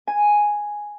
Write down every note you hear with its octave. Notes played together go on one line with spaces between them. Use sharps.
G#5